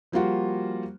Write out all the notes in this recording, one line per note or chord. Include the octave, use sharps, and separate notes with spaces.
F3 G3 A#3 F4 F#4